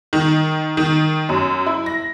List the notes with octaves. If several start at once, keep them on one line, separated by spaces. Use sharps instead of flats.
D#3
D#3
F#2
E4
A#6